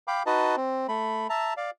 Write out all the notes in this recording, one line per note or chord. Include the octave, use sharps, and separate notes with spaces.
F5 G5 B5 D6
D#4 F#4 B4 D#5 A5
C4
A3 B5
E5 A5 A#5
D5 F5